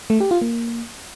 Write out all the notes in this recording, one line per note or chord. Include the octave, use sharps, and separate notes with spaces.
A3
G4
F4
A#3